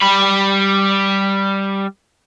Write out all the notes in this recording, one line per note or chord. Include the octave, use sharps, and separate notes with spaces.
G3 B5